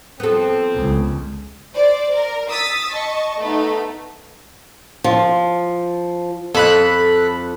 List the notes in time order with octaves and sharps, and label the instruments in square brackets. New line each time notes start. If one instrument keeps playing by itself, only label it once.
[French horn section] F3 C4 [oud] B3 A4
[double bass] C#2
[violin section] C5 D5
A#4
D#6 E6 A6 B6
D#5 A5 C#6
A3 B3 D#4
[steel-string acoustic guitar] F3
[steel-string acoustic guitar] F2 [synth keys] A4 B5 F#6